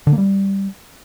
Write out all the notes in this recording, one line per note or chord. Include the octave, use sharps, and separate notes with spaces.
D3
A#3
G3